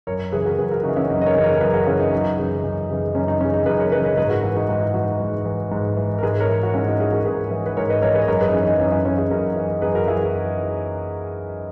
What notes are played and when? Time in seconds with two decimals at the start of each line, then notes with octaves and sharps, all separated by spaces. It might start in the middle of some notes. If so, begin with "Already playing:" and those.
0.07 F#2 A#4 C#5
0.32 C#3 E3 G#4 B4
0.45 F#4 A#4
0.58 F#2 G#4 B4
0.71 F#4 A#4
0.83 C#3 D#4 F#4
0.89 E3
0.96 C#4 E4
1.10 F#2 D#4
1.21 D#5
1.26 A#4 C#5
1.35 C#3 E3
1.44 A#4 C#5
1.55 A#4
1.61 F#2 G#4 B4
1.74 F#4 A#4
1.87 C#3 E3 C#4 E4
2.00 D#4
2.12 F#2
2.38 C#3 E3
2.64 F#2
2.90 C#3 E3
3.15 F#2 C#4
3.28 D#4
3.40 E3 C#4
3.44 C#3
3.54 D#4
3.66 F#2 G#4 B4
3.79 A#4 C#5
3.92 E3 B4 D#5
3.96 C#3
4.05 B4 D#5
4.17 G#2 G#4 B4
4.30 F#4 A#4
4.43 E3 E4 G#4
4.56 D#4 F#4
4.69 G#2 F#4
4.82 E4
4.94 E3 D#4 F#4
5.20 G#2
5.45 E3
5.71 G#2
5.97 E3
6.18 A#4
6.22 G#2 G#4 B4
6.40 A#4 C#5
6.48 E3
6.63 F#4
6.74 G#2 C#4 E4
6.87 D#4 F#4
7.00 E3 E4 G#4
7.12 F#4 A#4
7.25 G#2 G#4 B4
7.51 E3
7.66 B4
7.77 G#2 A#4 C#5
7.90 B4 D#5
8.02 E3 A#4 C#5
8.15 G#4 B4
8.22 D#5
8.28 F#2 A#4 C#5
8.41 G#4 B4
8.49 D#4
8.54 E3 C#4
8.67 D#4
8.79 F#2 C#4 E4
8.92 C#4 E4
9.05 E3 C#4 E4
9.18 E4 G#4
9.31 F#2 F#4 A#4
9.56 E3
9.82 F#2 G#4 B4
9.95 F#4 A#4
10.07 E3 E4 G#4